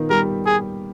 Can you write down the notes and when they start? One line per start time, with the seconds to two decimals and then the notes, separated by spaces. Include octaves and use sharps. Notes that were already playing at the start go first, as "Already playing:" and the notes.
Already playing: A#2 D#3 A#3 B3 D#4
0.10 G3 G4 A#4
0.46 G#4